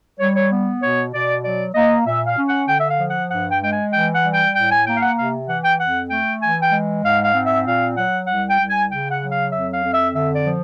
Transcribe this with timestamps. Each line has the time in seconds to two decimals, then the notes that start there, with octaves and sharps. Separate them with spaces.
0.19 G3 C#5
0.36 C#5
0.51 B3
0.82 B2 C#5
1.13 B2 D5
1.44 F#3 D5
1.75 A#3 D#5
2.06 A#2 E5
2.26 F5
2.37 C#4
2.48 F#5
2.68 D3 G5
2.80 E5
2.89 F5
3.00 F3
3.10 F#5
3.31 G2 F#5
3.51 G5
3.62 G#3 G5
3.71 G#5
3.92 E3 G5
4.13 F#5
4.24 G3
4.34 G5
4.55 A2 G5
4.71 G#5
4.86 A#3 G5
4.97 F5
5.02 F#5
5.17 C3 F5
5.48 E3 F#5
5.64 G5
5.79 F2 F#5
6.10 A3 G5
6.42 E3 G#5
6.61 G5
6.72 G#3
7.04 G#2 F5
7.24 F5
7.35 C4
7.45 E5
7.65 A#2 F5
7.97 F#3 F#5
8.27 C2 F#5
8.49 G5
8.59 C2
8.69 G#5
8.90 C#3 G5
9.11 F#5
9.21 F#3
9.31 F5
9.52 F2 E5
9.73 F5
9.83 F2
9.94 E5
10.14 D3 E5
10.35 D5
10.46 F3